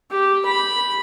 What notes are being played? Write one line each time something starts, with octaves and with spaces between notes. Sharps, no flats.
G4
B5